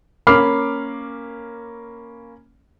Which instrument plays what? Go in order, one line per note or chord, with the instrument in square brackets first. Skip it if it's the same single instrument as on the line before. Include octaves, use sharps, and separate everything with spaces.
[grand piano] A#3 C#4 B5 D6 F6 C7